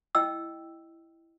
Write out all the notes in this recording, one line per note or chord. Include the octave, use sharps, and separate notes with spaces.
E4 D#5 G5 E6